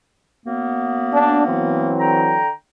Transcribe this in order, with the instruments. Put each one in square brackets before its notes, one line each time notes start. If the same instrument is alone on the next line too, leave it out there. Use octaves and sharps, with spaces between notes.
[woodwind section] F#2 A#3 B3
[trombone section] D4
E3 F#3 C4
[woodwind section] D3 G5 A#5